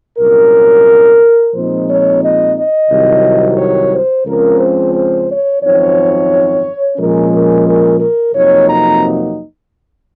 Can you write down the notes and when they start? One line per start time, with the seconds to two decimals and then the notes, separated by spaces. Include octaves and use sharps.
0.18 C2 A#2 F#3 C#4 A#4
1.54 A#2 F3 G#3 C4 D#4 C5
1.88 C#5
2.22 D#5
2.57 D#5
2.90 C2 C3 D#3 F#3
3.58 C#5
3.92 C5
4.25 C#2 C#3 F3 C4 A#4
4.59 C5
4.93 C5
5.28 C#5
5.62 G#1 F#2 F3 C4 D#4 C#5
6.97 A#2 F3 G#3 C#4 A#4
7.32 A#4
7.66 A#4
7.99 A#4
8.33 F2 C3 F#3 A#3 D#4 C#5
8.67 A#5